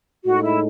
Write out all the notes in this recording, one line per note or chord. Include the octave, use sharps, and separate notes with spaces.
A2 G#3 D#4 F#4 A4
E4